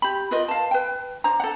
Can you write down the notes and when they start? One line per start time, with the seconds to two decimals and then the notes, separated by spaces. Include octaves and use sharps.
0.02 G4 B5
0.31 F4 A#4 B4 D#5
0.48 F5 A5
0.71 B4 G5
1.24 D4 C5 A#5
1.40 A4 F#5